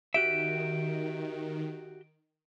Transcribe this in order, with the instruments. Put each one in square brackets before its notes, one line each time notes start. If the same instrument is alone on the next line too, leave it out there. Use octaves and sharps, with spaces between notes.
[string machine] D#3 [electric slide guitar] F#4 G4 E5 [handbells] D7